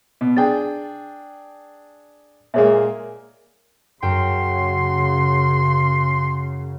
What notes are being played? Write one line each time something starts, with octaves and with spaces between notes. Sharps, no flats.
B2
D4 G#4 G5 A6
A#2 G#3 A#3 G#4 C#5 E5
F#2 C#3 G5 C6